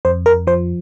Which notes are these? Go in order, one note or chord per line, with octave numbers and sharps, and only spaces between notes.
F2 C5
A#4
F3 C5